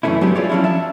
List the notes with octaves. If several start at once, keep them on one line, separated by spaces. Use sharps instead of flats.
F#2 E3 F3 A3 C#4 E4
F#3 G#3 B3 D4 G4
E4 F4 G#4 C#5 D5
F3 F#3 C#4 D4 E4
E5 A5